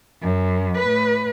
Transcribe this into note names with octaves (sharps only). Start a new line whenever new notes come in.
F#2
A2 B4